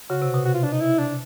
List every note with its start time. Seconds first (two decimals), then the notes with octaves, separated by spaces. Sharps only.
0.10 C#3 F#4
0.22 C3
0.34 B2
0.45 F#4
0.54 F4
0.64 D4
0.72 D#4
0.81 E4
0.99 D4